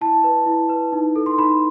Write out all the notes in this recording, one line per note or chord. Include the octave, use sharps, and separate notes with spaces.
E4 A5
B4
E4
B4
D#4
A4
C6
D#4 B5